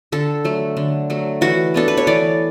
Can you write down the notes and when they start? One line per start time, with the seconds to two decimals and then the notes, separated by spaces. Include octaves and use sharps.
0.12 D3 A4
0.44 F#3 A3
0.77 D3
1.10 F#3 A3
1.41 E3 F#4
1.74 B3 D4 A4
1.88 B4
1.97 C#5
2.07 E3 D5